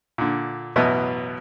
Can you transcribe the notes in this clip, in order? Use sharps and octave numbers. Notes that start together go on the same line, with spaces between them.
A#2 D3
A1 F#2 B2 B3 E4 D#5